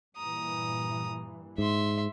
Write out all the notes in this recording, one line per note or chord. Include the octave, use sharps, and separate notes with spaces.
G2 A#2 E3 A#5 D#6
G#2 E5 C6